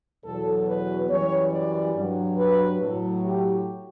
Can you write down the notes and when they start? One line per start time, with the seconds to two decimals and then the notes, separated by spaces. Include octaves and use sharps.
0.24 E2 B2 F#3 A4
0.68 B4
1.10 F#2 E3 G3 C#5
1.52 D5
1.96 G2 F#3
2.38 B4
2.81 A2 F#3 A4
3.24 G4